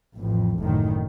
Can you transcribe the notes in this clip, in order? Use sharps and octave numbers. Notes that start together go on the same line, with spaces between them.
A1 F2
F#1 D2 A2 D#3